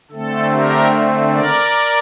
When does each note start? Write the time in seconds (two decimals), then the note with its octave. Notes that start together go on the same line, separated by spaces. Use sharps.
0.11 D3 A3 C4 A4
0.51 G4 A#4
1.32 A#4 D5